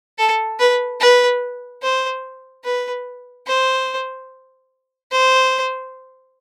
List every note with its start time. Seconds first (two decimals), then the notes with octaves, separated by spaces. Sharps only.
0.18 A4
0.60 B4
1.00 B4
1.83 C5
2.65 B4
3.47 C5
5.12 C5